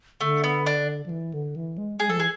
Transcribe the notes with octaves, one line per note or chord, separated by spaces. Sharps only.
D3 A3
B3
D4
F3
E3
D3
E3
G#3
G#3 G#4
F3 A4
E3 G#4